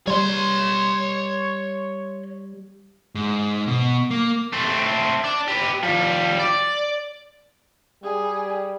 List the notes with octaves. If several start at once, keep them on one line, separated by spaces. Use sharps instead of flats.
G3 C#5 C6
G#2
B2
A#3
A3 C4
D5 A5
B3 G4
F3 G3
D5
G3 G#4